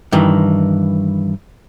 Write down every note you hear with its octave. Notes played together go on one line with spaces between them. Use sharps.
G2 D#3 E3